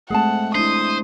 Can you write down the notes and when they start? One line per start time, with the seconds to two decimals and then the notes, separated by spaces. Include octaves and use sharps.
0.10 G#3 A3 C4 G#4 F#5 A5
0.55 D4 E4 C5 D#6